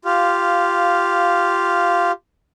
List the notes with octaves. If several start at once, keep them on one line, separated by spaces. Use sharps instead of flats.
F4 G4 F5